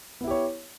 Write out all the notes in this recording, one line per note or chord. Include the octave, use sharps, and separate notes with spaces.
B3 E4 G4 C#5